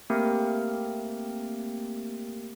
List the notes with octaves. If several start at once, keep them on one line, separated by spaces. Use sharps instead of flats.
A3 A#3 C4 G4 A#4